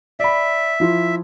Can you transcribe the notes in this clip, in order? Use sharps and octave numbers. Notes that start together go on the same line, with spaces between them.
D5 E5 B5
F3 E4 F4